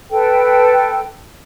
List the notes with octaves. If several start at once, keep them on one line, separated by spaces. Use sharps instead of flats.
A4 B4 G5